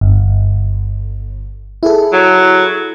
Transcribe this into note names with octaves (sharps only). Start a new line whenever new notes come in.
G1
E4 G#4 A4
F#3